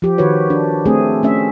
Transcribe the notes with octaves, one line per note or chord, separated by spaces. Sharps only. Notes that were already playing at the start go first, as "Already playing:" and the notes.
F3 G4
D#3 F#4 B4 C#5
D4
A3 C4 D4 G#4
A3 C#4 E5